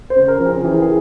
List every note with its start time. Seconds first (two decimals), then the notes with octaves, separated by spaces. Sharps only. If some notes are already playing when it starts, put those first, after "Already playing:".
0.10 C5
0.16 C#3
0.28 A#4
0.40 F3
0.46 G#4
0.57 C#3
0.64 E3 G#4
0.82 G#4